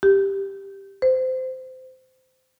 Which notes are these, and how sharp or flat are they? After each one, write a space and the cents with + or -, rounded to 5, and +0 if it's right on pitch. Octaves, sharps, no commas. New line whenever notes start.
G4 +5
C5 -20